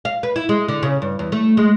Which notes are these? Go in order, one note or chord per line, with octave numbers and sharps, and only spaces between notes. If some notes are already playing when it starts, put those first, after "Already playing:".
F5
B4
E4
G#3
D3
C#3
G2
E2
A3
G#3